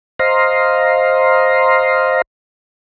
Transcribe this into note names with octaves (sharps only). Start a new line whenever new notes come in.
C5 D#5 F5 A#5 C6